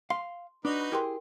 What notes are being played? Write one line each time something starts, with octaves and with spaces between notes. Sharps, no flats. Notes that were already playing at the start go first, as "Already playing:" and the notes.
F5 C6
D4 D#4 F#4 B4
E4 G4 G#4 A#4 G5 C6